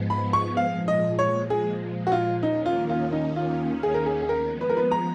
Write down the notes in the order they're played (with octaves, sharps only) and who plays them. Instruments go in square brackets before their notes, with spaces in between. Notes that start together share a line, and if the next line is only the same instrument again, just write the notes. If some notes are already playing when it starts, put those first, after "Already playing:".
Already playing: [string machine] G#2 F3 G#3 B3
[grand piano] B5
C#6
[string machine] A#2 F3 G#3 [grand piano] F5
[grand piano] D#5
C#5
G#4
F#4
F4
[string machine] D#2 D#3 A#3 C#4 [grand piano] D#4
[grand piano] F4
F4
D#4
F4
G#4
A#4
G#4
G#4
[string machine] F3 G#3 B3 [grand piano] A#4
[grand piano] B4
A#4
B4
A#5